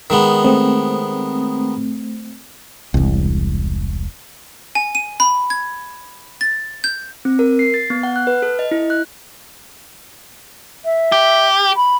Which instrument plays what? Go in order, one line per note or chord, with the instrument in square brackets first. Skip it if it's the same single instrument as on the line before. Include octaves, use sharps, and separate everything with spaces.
[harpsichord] D#3 G#3 B3
[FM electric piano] A3 C4
[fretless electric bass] E1 C2
[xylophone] G#5
D#7
B5
G#6
A6
G6
[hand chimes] C4
A#4
C7
A6
B3
F#5
F#6
B4
A4
D#5
E4
F#6
[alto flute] E5
[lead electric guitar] G4
[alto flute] B5